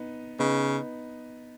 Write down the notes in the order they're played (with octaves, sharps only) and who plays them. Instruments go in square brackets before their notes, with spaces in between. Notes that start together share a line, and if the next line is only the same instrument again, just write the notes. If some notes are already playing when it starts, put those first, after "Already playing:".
Already playing: [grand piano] B3 D#4
[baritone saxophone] C#3 [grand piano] B3 D#4